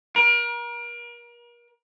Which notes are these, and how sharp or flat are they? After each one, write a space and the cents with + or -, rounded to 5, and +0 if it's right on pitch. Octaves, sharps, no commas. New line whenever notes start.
A#4 +35